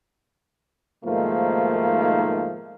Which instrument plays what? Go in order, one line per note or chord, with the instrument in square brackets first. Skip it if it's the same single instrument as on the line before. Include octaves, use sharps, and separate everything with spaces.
[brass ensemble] G#2 B2 D#3 F3 A3 A#3